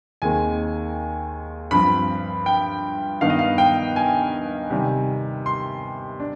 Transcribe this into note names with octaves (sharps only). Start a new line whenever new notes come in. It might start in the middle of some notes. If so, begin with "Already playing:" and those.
D#2 D#3 G#3 C4 G#5
G2 F3 C4 B5
G5
G2 D#3 B3 D#4 F5
D#5
F5
G5
G#5
C3 D#3 G3
C6
D4